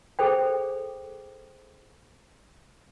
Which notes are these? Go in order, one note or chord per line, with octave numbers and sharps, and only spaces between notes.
G#4 A4 C5 G5